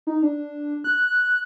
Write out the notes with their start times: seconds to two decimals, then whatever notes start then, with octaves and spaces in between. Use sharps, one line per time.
0.07 D#4
0.22 D4
0.84 F#6